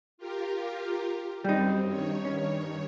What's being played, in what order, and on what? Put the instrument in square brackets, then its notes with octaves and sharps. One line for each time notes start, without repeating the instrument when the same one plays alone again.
[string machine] F4 G4 A#4
[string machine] F#2 C4 [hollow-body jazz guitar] G3 D#4
[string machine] G2 D#3 C#5
[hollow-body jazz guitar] C#4